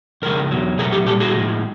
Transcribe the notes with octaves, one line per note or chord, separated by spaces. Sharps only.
F2 C#3 F3 G#3 A#4
E2 B2 F#3
B2 F#3 A3 G#4 A#4
G4 A4
A#2 G3 G4 A4
F#4 G#4
A2 F3 G#3